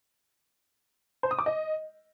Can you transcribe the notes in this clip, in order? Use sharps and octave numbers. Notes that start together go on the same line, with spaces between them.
C5
D#6
D6
D#5